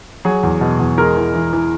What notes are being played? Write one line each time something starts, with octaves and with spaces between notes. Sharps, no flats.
F#3 G#4
E2
B2
E2
G#3 A#4
E3
E3
E3